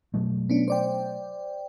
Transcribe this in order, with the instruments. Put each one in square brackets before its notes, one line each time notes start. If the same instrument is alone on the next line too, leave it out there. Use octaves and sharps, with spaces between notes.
[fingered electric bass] B2 F#3 A3
[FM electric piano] B3 C#4 D4
C5 D5 G5